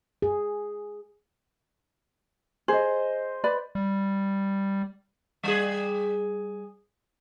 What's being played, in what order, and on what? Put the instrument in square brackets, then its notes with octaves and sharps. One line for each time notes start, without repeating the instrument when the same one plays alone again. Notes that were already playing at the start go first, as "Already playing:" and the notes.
[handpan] G#4
[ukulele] G#4 [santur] C5 D#5
[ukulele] B4 D5 B5
[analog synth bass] G3
[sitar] G3 G#4